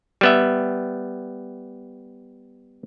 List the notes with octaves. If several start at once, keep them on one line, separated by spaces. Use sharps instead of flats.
G3 B3 E5